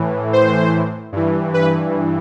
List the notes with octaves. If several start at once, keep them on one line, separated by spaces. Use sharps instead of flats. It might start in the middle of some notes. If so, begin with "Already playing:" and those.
Already playing: A2 E3
C5
G2 E3
B4